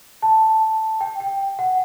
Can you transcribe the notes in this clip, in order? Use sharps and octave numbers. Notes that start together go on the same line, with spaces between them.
A5
G5
G5
F#5